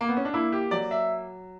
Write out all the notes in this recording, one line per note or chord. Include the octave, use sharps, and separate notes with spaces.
A#3
B3
C#4
D4
A#3 E4
G4
F#3 D5
E5